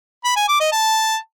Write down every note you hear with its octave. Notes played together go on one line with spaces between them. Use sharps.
B5
G#5
D6
D#5
A5